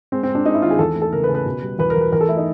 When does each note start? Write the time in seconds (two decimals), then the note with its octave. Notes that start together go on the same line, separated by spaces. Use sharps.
0.12 G#3 C4
0.23 C4
0.29 G#3
0.35 D4
0.46 G#3 D#4
0.54 E4
0.62 D#3 F4
0.71 G#4
0.79 E2 A4
0.96 A3
1.02 A4
1.12 C#3 A#4
1.24 B4
1.29 C#3
1.35 B4
1.46 B2
1.62 G3
1.79 E2 B4
1.90 A#4
1.96 E2
2.01 B4
2.12 E2 A#4
2.21 A4
2.29 A3 E4
2.37 D#4